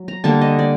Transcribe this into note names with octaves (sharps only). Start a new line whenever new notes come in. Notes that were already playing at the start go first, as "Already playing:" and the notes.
Already playing: F#3
A#5
D3 G3 A#3 A5
D#5
D5